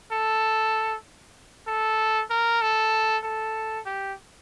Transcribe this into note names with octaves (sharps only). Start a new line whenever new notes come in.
A4
A4
A#4
A4
A4
G4